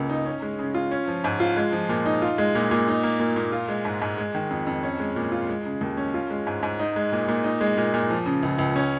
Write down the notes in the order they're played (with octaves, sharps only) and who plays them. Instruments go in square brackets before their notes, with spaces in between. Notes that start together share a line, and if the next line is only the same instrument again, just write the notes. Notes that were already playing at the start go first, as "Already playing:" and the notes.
Already playing: [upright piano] C#2 C#3 A#3
D#4
C#4
G#3
C#3
F4
C#4
F3
G#2
F4
G#3
F3
A#2
D#4
F4
G#3
A#2
A#2
D#4
A#3
A#2
A#2
F4
G#3
G#2
G#2
G#3
D#3
F2
F2
C#4
G#3
A#2
F4
G#3
C#3
D#2
C#4
F4
G#3
G#2
G#2
D#4
G#3
A#2
A#2
D#4
G#3
A#2
A#2
F3
C#3
C#2
C#2
C#4